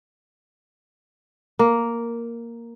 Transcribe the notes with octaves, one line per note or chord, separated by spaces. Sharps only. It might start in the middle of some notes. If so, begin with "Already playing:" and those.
A#3